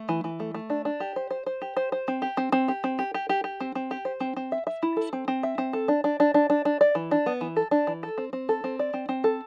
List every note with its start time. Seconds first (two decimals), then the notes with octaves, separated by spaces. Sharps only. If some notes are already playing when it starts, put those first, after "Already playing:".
Already playing: A3
0.09 E3
0.24 E3
0.40 A3
0.54 A3
0.70 D4
0.85 D4
1.00 G4
1.16 C5
1.31 C5
1.46 C5
1.62 G4
1.77 C5
1.92 C5
2.08 C4
2.22 G4
2.37 C4
2.52 C4
2.68 G4
2.84 C4
2.99 G4
3.14 G4
3.29 G4
3.44 G4
3.60 C4
3.75 C4
3.91 G4
4.05 C5
4.20 C4
4.37 C4
4.52 E5
4.67 E5
4.83 E4
4.97 A4
5.13 C4
5.28 C4
5.43 E5
5.58 C4
5.73 A4
5.88 D4
6.04 D4
6.20 D4
6.34 D4
6.50 D4
6.65 D4
6.81 D5
6.95 E3
7.11 D4
7.26 B3
7.41 E3
7.56 A4
7.71 D4
7.87 E3
8.03 A4
8.18 C4
8.33 C4
8.49 A4
8.64 C4
8.79 D5
8.94 C4
9.09 C4
9.24 A4